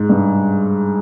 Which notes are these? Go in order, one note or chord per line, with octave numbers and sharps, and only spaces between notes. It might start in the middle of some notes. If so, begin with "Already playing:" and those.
Already playing: G#2
G2